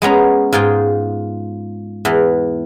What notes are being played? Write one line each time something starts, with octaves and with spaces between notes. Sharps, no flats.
G#3 B3 C#4 A#5
G#2 F4 G#4 G5
E2 E3